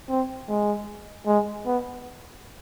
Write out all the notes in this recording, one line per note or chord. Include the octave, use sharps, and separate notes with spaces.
C4
G#3
G#3
B3